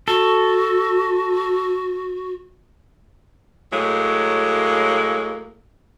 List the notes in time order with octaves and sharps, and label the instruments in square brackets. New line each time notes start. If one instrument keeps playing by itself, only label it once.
[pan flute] F#4 [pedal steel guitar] A4
[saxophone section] A2 F#3 G#3 A#3